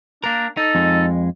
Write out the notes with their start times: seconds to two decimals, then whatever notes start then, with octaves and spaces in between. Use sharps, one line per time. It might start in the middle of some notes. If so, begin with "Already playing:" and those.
0.24 A#3 D4 A#4
0.57 D#4 A4
0.75 F2 G#3